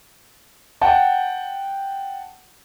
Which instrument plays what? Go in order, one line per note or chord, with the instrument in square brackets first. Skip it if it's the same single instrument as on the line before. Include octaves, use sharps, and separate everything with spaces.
[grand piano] F#5 G5 A5